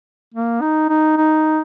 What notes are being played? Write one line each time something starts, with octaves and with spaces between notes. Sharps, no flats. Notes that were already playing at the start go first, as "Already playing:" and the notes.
A#3
D#4
D#4
D#4